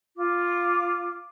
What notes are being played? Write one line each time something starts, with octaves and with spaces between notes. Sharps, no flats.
F4 D6